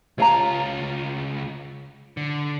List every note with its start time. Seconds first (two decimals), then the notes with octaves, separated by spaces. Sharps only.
0.18 C#2 F4 C#5 F5 A#5
2.17 D3